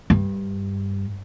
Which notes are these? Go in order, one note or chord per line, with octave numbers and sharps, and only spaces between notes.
G2